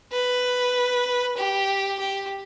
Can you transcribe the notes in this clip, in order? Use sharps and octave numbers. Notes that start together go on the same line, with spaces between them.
B4
G4
G4